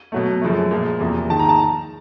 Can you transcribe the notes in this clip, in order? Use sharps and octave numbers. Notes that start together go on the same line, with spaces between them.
B2 F#3 A3
F#2 C#3 F3 A3
A#2 F3 G#3
E2 C3 F3 A#3
G#2 D#3 G#3 A5
A#5
A5